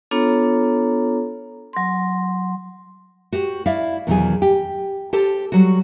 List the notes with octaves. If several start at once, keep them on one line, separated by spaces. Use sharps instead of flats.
B3 D4 F4 A4 C#5 A#5
F#3 C6
F#4 G4 C5
E4 D5 E5 F5
E2 B2 D#3 F#3 F4 G#4
G4
G4 A4 C5 A5
F#3 G3 F#4